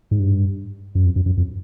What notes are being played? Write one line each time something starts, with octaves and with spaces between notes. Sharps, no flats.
G#2
G2
F#2
F2
F#2
F#2
F2